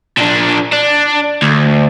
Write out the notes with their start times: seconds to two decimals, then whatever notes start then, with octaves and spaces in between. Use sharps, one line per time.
0.17 A#2 D4
0.72 D4
1.42 D2